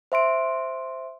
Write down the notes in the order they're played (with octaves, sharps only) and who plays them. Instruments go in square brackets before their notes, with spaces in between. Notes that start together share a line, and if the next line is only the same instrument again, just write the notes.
[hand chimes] C5 E5 C6 D7